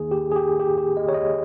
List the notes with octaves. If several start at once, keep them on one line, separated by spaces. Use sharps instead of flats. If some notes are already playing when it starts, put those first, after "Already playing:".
Already playing: D#2 D#3 A#3 D#4 G#4
G4
G#4
G4
G4
G4
D#5
C#5
D#5